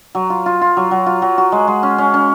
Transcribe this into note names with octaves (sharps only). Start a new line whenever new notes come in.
F#3
F4
F4
F4
F#3
F#3
F4
F#3
F#4
G#3
G#3
C#4
C#4
C#4